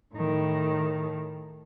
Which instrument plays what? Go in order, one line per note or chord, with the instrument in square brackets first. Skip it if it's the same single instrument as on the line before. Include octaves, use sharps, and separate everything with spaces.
[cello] A2 D#3